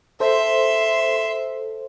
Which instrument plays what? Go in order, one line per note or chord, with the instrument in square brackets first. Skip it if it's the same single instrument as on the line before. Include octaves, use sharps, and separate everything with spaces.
[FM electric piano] A4 C5 [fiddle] E5 C6